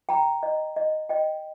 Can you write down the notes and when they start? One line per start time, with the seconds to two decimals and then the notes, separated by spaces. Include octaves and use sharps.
0.09 G5 A#5
0.43 D#5
0.76 D#5
1.09 D#5 G5